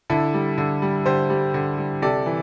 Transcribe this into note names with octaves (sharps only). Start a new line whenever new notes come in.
D3 E4 A4
G3
D3
G3
D3 G4 C5
G3
D3
G3
C3 A4 D5
E3